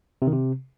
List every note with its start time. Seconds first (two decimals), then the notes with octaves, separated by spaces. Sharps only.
0.22 C3
0.27 D#3
0.33 C3